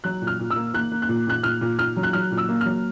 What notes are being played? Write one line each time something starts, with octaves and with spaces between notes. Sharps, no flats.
F#3 F#6
A#2
F6
A#2
E6
A#3
A#3 F#6
A#3
F#6
A#2
A#2 F#6
A#2 F6
A#2
A#2 F6
F#3
F#6
F#3 F6
A#2
E6
A#3
F#3 F6